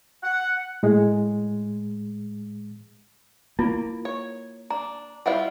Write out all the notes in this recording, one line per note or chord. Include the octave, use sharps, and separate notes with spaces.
F#5
A2 G#3
A#3 E4 F4
C#5
D4 A#5
G3 E4 F4 C5 F#5